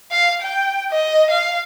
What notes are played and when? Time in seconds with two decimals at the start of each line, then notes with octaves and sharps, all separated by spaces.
0.11 F5
0.41 G5
0.91 D#5
1.30 F5